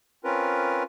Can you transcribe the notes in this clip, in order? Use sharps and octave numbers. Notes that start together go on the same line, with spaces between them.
C4 C#4 F4 A#4 B4